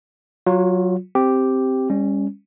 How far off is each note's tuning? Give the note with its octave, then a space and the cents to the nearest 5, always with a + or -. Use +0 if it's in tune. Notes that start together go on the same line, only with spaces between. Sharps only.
F#3 +0 F4 +25
C4 +0 G4 +0
G3 +40 C#4 +0